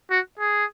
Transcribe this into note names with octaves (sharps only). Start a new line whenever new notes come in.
F#4
G#4